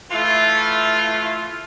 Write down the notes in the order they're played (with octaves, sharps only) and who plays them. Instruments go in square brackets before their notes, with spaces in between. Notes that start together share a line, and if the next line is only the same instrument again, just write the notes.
[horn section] E3 A3 E4 F4